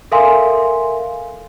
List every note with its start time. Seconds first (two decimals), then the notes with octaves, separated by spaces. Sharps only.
0.12 A4 A#4 E5 F5 G#5 C6